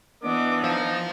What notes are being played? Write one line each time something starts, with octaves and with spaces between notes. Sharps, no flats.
E3 B3 D4 D#5 D6
D#4 C5 F5